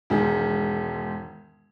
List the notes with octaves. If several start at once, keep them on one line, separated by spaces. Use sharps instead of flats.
E1 G#2 D#3 G#4